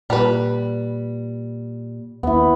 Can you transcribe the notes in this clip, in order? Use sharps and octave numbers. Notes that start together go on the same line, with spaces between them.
A#2 G3 B4
D#2 B3 E4